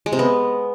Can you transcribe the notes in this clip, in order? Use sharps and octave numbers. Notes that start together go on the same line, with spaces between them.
G#3
C3
B3